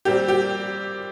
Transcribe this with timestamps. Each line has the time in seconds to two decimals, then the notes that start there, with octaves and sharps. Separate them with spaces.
0.05 A#2 G3 C4 G4
0.28 G4